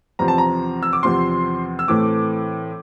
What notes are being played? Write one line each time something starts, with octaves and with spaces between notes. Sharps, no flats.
E2 C3 F3 C4 A#5
A5
A#5
E6
D6
E2 C3 F3 C4 C6
E6
A2 E3 A3 C4 D6